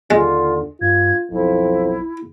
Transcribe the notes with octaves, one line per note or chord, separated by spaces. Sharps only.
D#2 D3 G#3 F4
G2 F4 G#6
B1 F2 E4